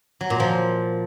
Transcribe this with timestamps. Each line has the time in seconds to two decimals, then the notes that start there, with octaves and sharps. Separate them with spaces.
0.21 F#3
0.30 A#2
0.40 F3